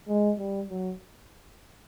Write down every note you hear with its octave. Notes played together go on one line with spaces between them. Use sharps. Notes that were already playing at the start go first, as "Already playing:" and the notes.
G#3
G3
F#3